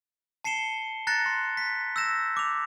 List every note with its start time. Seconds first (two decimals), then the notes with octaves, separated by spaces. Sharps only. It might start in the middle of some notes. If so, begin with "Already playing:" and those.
0.44 A5 C7 C#7 E7 G7
1.07 A#5 F#6 A6 A#6 C#7
1.26 C6
1.57 B6
1.96 E6 G6 A#6 E7
2.37 D6 F7